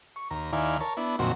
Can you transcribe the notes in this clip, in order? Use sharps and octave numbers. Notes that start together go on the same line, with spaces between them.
C#6
D#2 A#5
D#2 D#3 E4 D5 F5 G#5
A#4 C#5 A5
B3 D4 E4
F2 A#2 D#3 F#3 C4 F#4